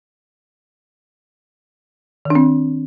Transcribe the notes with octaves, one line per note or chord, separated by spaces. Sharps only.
D#3 C4 D4